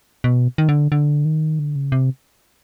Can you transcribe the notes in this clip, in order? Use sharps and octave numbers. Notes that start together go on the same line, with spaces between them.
B2
D#3
D3
D3
D#3
D3
C#3
C3